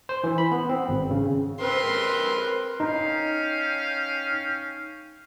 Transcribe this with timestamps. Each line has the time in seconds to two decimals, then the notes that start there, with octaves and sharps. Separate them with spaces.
0.09 C5
0.24 E3
0.38 B5
0.52 B3
0.69 C4
0.89 G#1
1.11 C#3
1.61 C4 A#4 B4 C6
2.80 C#4 D#4 F5 G5